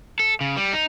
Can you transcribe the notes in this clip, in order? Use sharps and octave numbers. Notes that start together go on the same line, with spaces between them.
A4
C#3
G3
D#4